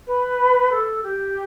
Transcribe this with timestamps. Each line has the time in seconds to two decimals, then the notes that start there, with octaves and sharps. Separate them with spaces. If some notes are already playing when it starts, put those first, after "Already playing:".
0.07 B4
0.71 A4
1.03 G4